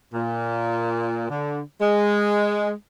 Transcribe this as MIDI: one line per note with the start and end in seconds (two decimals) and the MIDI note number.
0.14 1.27 46
1.30 1.61 50
1.81 2.71 56